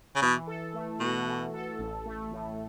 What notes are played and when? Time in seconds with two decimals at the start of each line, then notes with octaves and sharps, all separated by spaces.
0.15 C#3
0.22 B2 E3
0.47 A4
0.74 A3
1.00 B2 F#4
1.27 E3
1.53 A4
1.79 A1
2.06 A3
2.32 A2